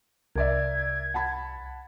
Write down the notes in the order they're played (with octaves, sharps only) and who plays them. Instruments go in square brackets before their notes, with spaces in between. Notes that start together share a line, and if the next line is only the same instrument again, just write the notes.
[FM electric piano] C2 [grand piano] A#4 D5 E5 [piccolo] G#6
[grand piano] F#5 A5 B5